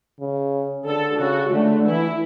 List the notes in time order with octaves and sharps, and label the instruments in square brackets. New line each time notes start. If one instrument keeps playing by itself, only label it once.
[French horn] C#3
[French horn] D3 [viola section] A4
[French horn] C#3 [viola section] F#4
[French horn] D3 [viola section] A3
[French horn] E3 [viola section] E4